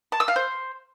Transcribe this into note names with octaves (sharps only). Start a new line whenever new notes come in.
A5
E6
F5
C5